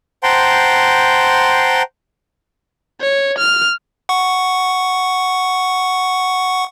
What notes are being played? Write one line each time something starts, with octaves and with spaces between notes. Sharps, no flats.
C5 F#5 G5 A5 A#5 C6
C#5
F6
F#5 C#6